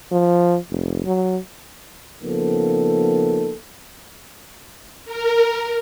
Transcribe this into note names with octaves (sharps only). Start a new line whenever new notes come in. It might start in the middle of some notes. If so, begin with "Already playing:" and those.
F3
F1
F#3
C#3 F3 A#3 B3 D#4 A4
A#4